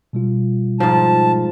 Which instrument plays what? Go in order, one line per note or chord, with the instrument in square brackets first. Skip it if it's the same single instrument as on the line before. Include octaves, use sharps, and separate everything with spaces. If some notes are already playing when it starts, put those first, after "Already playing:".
[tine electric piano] B2 G3 F4
[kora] G#2 F3 [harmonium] A5